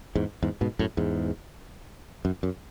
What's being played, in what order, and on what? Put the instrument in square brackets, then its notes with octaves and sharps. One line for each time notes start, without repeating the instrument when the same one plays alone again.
[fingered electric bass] E2 G#2
E2 G#2
G#2 B2
F#2 A2
E2 G#2
F#2
F#2